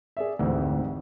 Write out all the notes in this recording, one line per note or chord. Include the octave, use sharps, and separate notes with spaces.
G#4 D5 E5
F1 D2 G#2 E3 C4